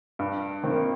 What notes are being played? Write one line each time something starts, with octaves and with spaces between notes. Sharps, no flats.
G2
D#3 C4
A#3